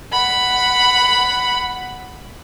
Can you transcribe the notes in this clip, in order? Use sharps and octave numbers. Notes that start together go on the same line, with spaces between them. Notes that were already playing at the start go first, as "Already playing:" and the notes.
F#5 B5